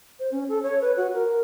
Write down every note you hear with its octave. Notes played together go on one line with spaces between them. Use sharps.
C5
C#4
A4
C#5
B4
F#4
A#4